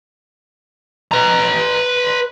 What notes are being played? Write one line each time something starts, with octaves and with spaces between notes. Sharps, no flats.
B4 A#5